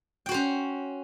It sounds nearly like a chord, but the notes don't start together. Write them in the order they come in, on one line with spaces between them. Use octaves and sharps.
G5 F#4 C5 C#4